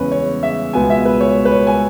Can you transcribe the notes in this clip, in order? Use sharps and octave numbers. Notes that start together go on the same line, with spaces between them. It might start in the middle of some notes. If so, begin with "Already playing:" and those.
Already playing: E2 C#3 G#3 C#4 B4 C#5
C#5
E5
C#2 B2 B3 G#5
E5
B4
C#5
B4
C#5
G#5